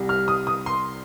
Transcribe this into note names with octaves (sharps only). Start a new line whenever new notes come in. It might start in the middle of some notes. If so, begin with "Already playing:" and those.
Already playing: C2 C3 G3
F6
D#6
D#6
C6